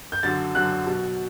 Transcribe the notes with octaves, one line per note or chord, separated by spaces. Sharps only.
G6
F#2 D3 F#3 A6
F#2 D3 F#3 F#6
B2 F#3